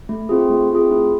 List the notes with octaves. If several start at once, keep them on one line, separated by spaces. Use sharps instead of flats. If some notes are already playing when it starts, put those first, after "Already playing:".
A3
C4 F4 G#4
A3
C4 F4 G#4
E4